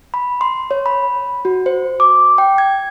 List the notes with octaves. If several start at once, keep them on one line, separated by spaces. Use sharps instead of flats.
B5
C6
C#5
B5
F#4
C5
D6
G5
G#6